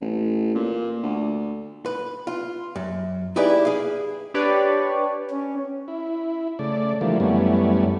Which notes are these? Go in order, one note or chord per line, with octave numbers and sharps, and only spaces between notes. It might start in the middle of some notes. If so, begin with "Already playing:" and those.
A1
A#2
D2
B4
F4
F#2
D#4 E4 G4 G#4 B4 D5
G#4 F5
D4 G4 B4 C#5 D5
C#4
E4
C#3 A3 D5
D3 E3 F3 G3 A3 A#3
F#2 E3 G3 A3 B3 C#4